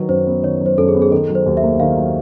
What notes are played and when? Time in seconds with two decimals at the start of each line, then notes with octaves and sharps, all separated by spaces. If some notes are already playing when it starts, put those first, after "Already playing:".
Already playing: D#3 F#3 B4
0.09 F#2 C5
0.27 B3
0.43 D#3 C#5
0.61 F#3 C5
0.78 F#2 A4
0.88 G#4
0.95 B3
1.02 G#4
1.11 D#3 A4
1.29 F#3
1.35 C5
1.46 D#2
1.57 E5
1.63 A#3
1.80 D#3 F5
1.97 F#3